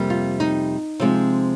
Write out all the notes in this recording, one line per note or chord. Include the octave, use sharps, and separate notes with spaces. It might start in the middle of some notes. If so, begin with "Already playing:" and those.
Already playing: F2 C3 G3 A#3
F4
D#4
C3 F3 G#3 C4